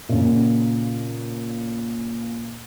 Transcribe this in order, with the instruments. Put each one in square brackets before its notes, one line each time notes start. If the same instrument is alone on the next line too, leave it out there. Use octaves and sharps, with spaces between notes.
[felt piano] A#2 C#3